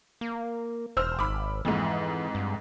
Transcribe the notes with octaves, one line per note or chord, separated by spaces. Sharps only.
A#3
E1 C5 E6 F6
G#1 B5 D6
F2 G#2 E3
G2